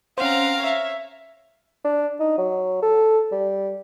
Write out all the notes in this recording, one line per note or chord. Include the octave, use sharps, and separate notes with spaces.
C4 C#4 C5 F5 F#5 A#5
C#5 E5
D4
D#4
F#3
A4
G3